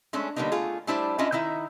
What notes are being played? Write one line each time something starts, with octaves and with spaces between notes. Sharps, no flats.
G#3 A3 C#4 D4
D3 G3 A#3 B3 D4 D#4
A3 F4 G#4
G3 A3 D4 E4 C5 D5
C#4 D4 F4 D#5 E5
D#3 D#4 E4 E5